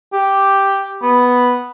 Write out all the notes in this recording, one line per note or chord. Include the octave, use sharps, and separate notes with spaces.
G4
B3